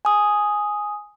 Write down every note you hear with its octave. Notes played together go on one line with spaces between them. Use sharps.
G#5 D#6